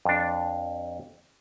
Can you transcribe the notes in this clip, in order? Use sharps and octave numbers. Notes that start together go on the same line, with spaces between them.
F2 D4